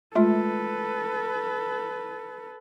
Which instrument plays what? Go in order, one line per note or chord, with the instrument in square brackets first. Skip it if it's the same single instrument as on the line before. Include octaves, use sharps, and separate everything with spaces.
[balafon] G#3 A3 F4 [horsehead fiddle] A4 B4